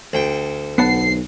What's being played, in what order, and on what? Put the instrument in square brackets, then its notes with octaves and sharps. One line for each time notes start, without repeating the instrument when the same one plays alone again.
[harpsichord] D2 G5
[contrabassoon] B1 [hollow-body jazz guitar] B3 F#5 A5 [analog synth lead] C7